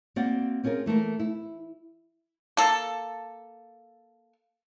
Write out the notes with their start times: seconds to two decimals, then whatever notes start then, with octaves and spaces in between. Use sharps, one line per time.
0.16 A#3 C4 F#4 D5 F#5
0.64 C4 C#4 F4 G#4 A#4
0.86 E3 A3 A#3 A#4
1.19 E4
2.57 A#3 A4